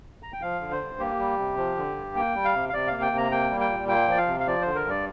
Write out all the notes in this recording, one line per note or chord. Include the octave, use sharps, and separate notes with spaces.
A#5
G5
F3 F5
D3
C5
G2
A#3 G4
G3
C3
F3
D3
G2
A#3 G5
G3
F5
C3
F5
C3 D5
A#3 F5
G5
C3
A#5
A#3 G5
G3
G5
A#2
A#3 G5
F3 D5
F5
C3
F5
F3 D5
D3 C5
A#4
G2 D5